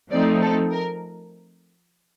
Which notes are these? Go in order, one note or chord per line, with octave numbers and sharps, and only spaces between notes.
F3 A3 C4 D#4 D5
A4
A#4